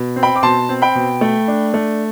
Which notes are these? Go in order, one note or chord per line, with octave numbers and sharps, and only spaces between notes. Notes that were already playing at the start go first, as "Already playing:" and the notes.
Already playing: B2
C4
G5 B5
D6
B2 A5 C6
C4
G5 B5
B2
A3
D4
A3